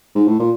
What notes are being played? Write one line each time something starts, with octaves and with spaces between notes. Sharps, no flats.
G#2
A2
A#2